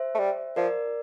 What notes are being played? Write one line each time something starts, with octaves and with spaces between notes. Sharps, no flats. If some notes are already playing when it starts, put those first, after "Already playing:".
Already playing: C5 E5
A3
G3
F3 A#4 D5